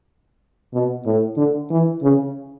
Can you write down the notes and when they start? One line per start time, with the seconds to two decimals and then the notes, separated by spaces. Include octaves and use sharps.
0.73 B2
1.06 A2
1.37 D3
1.71 E3
2.02 C#3